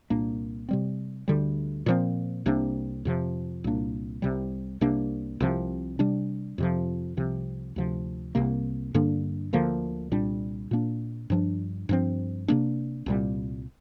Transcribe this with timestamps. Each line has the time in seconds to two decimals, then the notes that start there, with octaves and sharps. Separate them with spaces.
0.10 C2 A#2 A#3 D4
0.69 C3 G3 C4
1.28 D2 D3 G3
1.86 A#2 F3 C4
2.46 C2 C3 A#3 D4
3.05 F2 C3 F3
3.64 C2 A#2 A#3 D4
4.22 C2 C3 G3
4.81 C2 C3 A#3 D4
5.40 C2 C3 F3
5.99 C3 G3 D4
6.58 F2 C3 F3
7.17 C2 C3 F3
7.76 D2 C3 F3
8.35 C2 C3 A#3
8.94 G2 D3 A#3 D4
9.53 D2 D3 F3 A#3
10.12 C2 A#2 G3 D4
10.71 A#2 A#3 D4
11.30 G2 F3 D4
11.89 G2 F3 C4
12.48 C3 A#3 D4
13.06 C2 A#2 G3